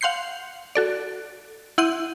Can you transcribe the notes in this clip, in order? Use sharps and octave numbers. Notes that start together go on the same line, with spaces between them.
F5 F#5 C6 G6 C7 C#7
F#4 A4 D5
E4 F#5 C6 G6 D#7